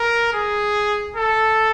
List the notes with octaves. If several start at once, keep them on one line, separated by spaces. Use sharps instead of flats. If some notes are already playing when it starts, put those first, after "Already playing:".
Already playing: A#4
G#4
A4